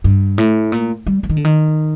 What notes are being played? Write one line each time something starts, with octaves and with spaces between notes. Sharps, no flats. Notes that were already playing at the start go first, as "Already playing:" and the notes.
G2
A2
A#2
G3
F3
D#3
D3
D#3